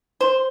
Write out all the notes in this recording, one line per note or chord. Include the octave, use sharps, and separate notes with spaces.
C5